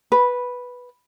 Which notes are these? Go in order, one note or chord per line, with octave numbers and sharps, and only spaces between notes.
B4